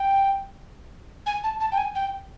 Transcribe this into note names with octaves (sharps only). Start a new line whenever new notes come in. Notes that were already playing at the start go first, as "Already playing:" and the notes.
Already playing: G5
G#5
A5
A5
G5
G#5
G5